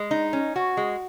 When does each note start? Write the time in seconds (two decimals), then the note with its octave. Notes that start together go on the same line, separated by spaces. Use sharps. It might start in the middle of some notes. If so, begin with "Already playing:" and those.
Already playing: G#3
0.11 D#4
0.33 C#4
0.56 F#4
0.77 G#3